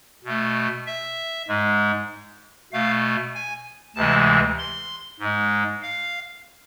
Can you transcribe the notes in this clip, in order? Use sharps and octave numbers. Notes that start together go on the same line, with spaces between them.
B2 A3
E5
G#2 G#3
B2 A3 F5
G#5
D2 C3 E3 G#3 A5
C6
G#2 G#3
F5